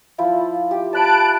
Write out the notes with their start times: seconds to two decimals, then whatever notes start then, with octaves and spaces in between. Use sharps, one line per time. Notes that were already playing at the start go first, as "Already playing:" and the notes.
0.18 F3 E4 F4
0.71 G4
0.93 D5 A5 B5 F#6 D7